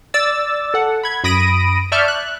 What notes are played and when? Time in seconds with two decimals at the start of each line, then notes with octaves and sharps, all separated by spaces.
0.14 D5 E6 A6
0.74 A4 F#5
1.03 B5 G#6
1.24 F#2 B5 D#6 A#6 D7 D#7
1.92 D5 E5 A5 C#6 F6 G6
2.08 F#6